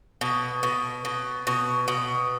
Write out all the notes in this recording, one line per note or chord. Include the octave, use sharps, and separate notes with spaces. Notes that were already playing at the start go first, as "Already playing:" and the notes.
B2
B2
B2
B2
B2